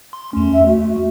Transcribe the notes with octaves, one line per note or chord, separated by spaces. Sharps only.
C6
E2 A3 C#4
E5
A3 F#4